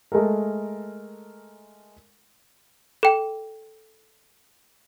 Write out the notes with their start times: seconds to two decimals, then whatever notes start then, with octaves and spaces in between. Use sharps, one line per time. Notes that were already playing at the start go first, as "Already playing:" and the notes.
0.12 G#3 A3 A4 A#4
3.03 A4 G5